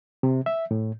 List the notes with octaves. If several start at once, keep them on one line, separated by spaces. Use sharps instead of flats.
C3
E5
A2